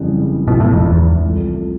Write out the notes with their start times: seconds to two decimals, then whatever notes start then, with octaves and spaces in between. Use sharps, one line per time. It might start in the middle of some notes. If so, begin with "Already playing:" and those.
Already playing: F#1 F2 C#3 E3 G3
0.48 A#1 G#2 B2 E3
0.60 A2
0.73 F2
0.86 E2
1.23 C2 C3 F3 A3